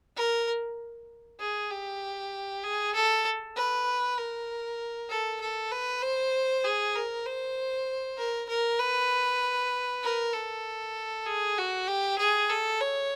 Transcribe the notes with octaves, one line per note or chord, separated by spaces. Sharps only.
A#4
G#4
G4
G#4
A4
B4
A#4
A4
A4
B4
C5
G#4
A#4
C5
A#4
A#4
B4
A#4
A4
G#4
F#4
G4
G#4
A4
C#5